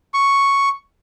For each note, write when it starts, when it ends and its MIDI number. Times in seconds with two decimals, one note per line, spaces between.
0.14 0.69 85